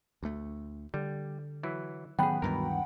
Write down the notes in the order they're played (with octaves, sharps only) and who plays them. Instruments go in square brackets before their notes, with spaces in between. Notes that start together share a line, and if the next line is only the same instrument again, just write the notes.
[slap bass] D2 A3
[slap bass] D3 [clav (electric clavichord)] G3
[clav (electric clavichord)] E3 F#3 E4
[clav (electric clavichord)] A1 G#4 [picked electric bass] D#3 F#3 B3 [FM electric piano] F#5 G5 B5
[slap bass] D2 G2 E3 [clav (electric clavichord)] B2 A#4